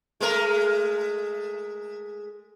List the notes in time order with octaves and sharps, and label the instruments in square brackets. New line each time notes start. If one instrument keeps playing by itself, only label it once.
[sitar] G#3 A3 A#4